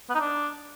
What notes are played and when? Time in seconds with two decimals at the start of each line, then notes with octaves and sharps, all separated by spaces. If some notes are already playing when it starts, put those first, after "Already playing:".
0.09 B3
0.15 D#4
0.20 D4